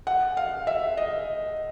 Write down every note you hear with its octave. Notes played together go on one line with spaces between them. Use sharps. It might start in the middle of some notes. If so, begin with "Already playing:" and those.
F#5
F5
E5
D#5